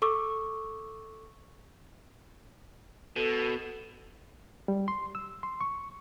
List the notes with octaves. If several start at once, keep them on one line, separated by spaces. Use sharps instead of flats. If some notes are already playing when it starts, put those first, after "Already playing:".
A4 C#6 D6 E6
B2 A4
G3
C6
E6
C6
C#6